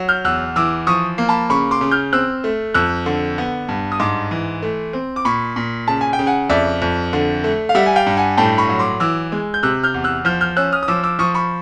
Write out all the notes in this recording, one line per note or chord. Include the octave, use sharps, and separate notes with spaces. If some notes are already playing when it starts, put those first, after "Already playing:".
Already playing: F#3
F6 G6
E2 E6 F#6
E3 D6 E6
F3 C#6 D#6
A#3
A5 B5
C#3 B5 C#6
C6 D6
C#3
F6 G6
C4 E6 F#6
A3
F2 E6 F#6
D3
B3
G2
D#6
G#2 C6 D6
E3
A3
C4
D6
A#2 B5 C#6
A#2
C#3 A5
G#5
G5
C#3
F#5 G#5
F2 D5 E5
F2
D3
A3
F5
G3 E5 F#5
G#5
F5 G5
G2
F#5 G#5
A2 G5 A5
B5 C#6
F#3
C6 D6
E3 D6 E6
G#3
G6
C3 E6 F#6
F6 G6
E2
E6 F#6
F3 F6 G6
F6 G6
C#4 E6 F#6
D#6 F6
D#6
F3 D6 E6
D6 E6
F3 C#6 D#6
B5 C#6